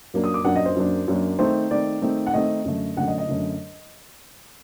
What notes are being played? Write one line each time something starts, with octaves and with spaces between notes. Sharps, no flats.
F#2 F#3 A#3 D4
D#6
D6
F#2 F#3 A#3 D4 F#5
D#5
C5
F#2 F#3 A#3 D4
F#2 F#3 A#3 D4
D#3 A3 C4 D#4 C5
D#3 A3 C4 D#4 D5
D#3 A3 C4 D#4
F#5
D#3 A3 C4 D#4 D#5
F#2 D3 A3
F#2 D3 A3 F#5
D#5
D#5
F#2 D3 A3